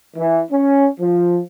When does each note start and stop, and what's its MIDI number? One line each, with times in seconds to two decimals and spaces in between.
0.17 0.41 52
0.51 0.88 61
1.00 1.40 53